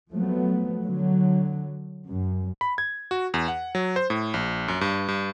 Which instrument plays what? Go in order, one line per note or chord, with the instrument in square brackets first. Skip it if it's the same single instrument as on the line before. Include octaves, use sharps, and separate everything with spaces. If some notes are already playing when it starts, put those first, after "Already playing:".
[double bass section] F3 F#3 A3 B3
D3 F#3
F#2
[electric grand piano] B5
G#6
F#4
E2
F#5
F#3
C5
A2
A#1
F#2
G2
G2